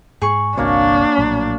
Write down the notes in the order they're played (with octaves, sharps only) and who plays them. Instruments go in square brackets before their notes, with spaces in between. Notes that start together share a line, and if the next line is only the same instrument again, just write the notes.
[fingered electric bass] G#2 [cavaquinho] G#4 C#6
[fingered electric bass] G1 C2 C4 [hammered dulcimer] A#3 F#4 C#5 [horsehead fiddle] D4
[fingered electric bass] A#1 A2 F#3